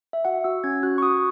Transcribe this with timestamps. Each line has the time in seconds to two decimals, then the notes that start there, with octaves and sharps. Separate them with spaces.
0.13 E5
0.25 F#4 F#5
0.44 F#4 E6
0.64 C#4 G#6
0.83 F#4 F#6
0.98 C#6
1.02 F#4 D#6